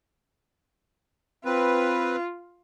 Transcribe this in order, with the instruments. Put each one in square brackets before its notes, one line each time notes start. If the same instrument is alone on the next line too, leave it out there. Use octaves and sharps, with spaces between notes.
[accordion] C4 B4 [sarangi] F4